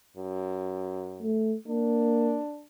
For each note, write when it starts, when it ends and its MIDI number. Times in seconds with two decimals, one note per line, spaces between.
0.17 1.41 42
1.22 1.56 57
1.68 2.40 58
1.68 2.65 62